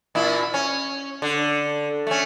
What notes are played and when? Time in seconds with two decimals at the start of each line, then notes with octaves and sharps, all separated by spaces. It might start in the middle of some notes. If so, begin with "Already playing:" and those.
0.15 A#2 E4
0.54 C#4
1.22 D3
2.07 A3 C#4